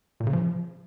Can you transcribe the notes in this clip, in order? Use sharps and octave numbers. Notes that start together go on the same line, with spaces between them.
A#2
C#3
F3